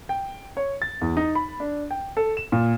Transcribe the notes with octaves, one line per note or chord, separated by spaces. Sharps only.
G5
C#5
A6
E2
D#4
B5
D4
G5
A4
E7
A#2